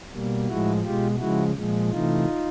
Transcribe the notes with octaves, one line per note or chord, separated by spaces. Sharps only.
B2 G3 A#3
A2 F3 G#3 E4 F#4
B2 G#3 F4 G4
C#3 F3 G#3 E4 F#4
A#2 F3 G#3
C3 E3 A3 D#4 F4